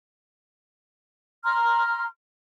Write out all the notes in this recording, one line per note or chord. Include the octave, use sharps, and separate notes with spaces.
A#5 C6 F6